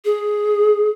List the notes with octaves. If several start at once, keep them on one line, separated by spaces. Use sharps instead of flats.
G#4